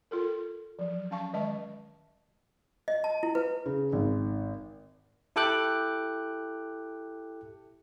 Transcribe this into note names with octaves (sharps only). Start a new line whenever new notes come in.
F4 A4 A#4
F3 F#3
C#4 F5 A5 C#6
D#3 G#3 D#5 E5 A5
D#5
A5
E4
B4
C#3
G#1
E4 G4 A4 G5 D6 F#6